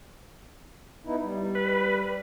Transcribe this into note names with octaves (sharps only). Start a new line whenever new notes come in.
B3 D#4 E4
G3
B4